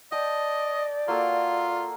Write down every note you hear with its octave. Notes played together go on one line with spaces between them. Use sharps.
D5 D#5 G5 A5
A#3 F4 F#4 A4